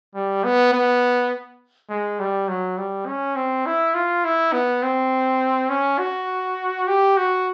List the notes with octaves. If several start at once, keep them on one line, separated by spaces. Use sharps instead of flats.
G3
B3
B3
G#3
G3
F#3
G3
C#4
C4
E4
F4
E4
B3
C4
C#4
F#4
G4
F#4